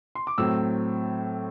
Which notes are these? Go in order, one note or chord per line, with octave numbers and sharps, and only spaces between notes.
C6
D6
A2 F#3 C4 E6